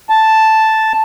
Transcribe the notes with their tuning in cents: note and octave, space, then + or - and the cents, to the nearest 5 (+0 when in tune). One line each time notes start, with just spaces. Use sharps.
A5 +0